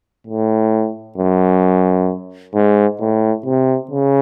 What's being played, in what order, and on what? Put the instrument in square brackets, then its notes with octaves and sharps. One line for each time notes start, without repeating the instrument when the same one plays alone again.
[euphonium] A2
F#2
G#2
A2
C3
C#3